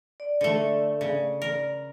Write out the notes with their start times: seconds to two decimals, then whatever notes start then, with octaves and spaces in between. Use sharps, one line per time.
0.20 D5
0.41 D3 A3
1.01 C#3
1.42 A#4